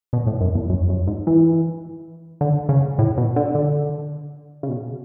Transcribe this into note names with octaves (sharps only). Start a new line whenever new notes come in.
B2
A2
F#2
E2
F#2
F#2
G#2
E3
D3
C#3
A2
B2
D3
D3
C#3
B2